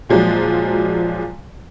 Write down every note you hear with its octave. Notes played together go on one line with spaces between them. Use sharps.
A#2 F3 F#3 G#3